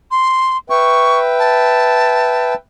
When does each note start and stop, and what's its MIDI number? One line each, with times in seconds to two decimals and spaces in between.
0.11 0.57 84
0.70 2.54 71
0.70 2.54 76
0.70 2.54 79
0.70 1.19 85
1.39 2.55 81